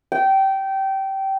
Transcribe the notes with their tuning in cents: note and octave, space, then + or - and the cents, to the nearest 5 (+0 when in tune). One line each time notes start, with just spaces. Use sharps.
G5 -20